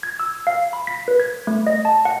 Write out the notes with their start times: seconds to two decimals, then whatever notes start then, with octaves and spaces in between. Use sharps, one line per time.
0.03 G#6
0.20 E6
0.47 F5
0.73 B5
0.87 B6
1.08 B4
1.20 G#6
1.47 A3
1.67 D#5
1.85 A5
2.05 F#5